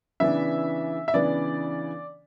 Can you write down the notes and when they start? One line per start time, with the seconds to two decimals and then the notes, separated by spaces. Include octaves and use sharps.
0.20 C#3 E3 B3 D4 E5
1.08 E5
1.14 C#3 E3 B3 D4 D5